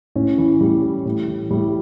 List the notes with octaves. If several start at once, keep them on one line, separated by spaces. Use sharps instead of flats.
A2 C#4
E3
A2 G3
E3
A2
E3
A2 G3